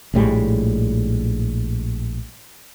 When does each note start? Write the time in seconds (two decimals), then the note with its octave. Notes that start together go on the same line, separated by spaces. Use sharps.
0.14 A#1 A2 G3 G#3